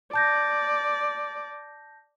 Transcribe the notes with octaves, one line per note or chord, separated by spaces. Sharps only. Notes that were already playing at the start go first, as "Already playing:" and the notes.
D5 A5 G6 A#6